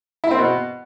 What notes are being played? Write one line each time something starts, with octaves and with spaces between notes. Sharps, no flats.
E4
C4
B2